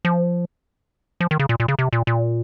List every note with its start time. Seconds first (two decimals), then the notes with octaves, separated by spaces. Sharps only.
0.05 F3
1.20 F3
1.31 D#3
1.39 C#3
1.49 A#2
1.60 A#2
1.68 C#3
1.79 C3
1.93 A#2
2.07 A#2